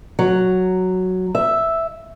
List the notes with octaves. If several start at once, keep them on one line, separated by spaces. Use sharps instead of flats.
F#3
E5